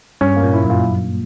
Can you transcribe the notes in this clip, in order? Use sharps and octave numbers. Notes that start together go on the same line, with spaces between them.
G2 C#4
A#3
A#2
E4
F#2
A#2